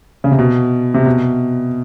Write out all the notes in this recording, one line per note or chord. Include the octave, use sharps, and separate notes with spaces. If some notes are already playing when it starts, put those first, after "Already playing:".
C#3
C3
B2
C3
B2